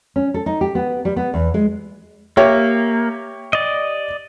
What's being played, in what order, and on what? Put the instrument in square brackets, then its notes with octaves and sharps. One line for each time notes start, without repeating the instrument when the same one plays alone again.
[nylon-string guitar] C#4
A4
D#4
G4
B3
G3
B3
E2
G#3
[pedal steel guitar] A#3 [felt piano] G4 C#5 E5
[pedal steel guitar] D5 D#5